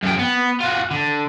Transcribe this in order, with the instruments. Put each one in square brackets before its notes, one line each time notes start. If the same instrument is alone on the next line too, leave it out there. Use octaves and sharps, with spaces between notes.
[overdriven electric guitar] F#2 G5
B3
F4 F#4
D3